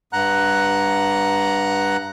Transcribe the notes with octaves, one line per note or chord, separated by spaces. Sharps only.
G2 F#5 A#5 F#6